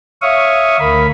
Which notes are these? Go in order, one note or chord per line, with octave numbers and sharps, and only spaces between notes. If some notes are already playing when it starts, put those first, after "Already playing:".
C#5 E5 F5 C#6 D#6
D2 A#4 B5